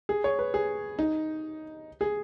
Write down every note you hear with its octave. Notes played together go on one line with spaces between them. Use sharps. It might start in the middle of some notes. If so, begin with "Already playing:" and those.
G#4
C#5
B4
G#4
D#4
G#4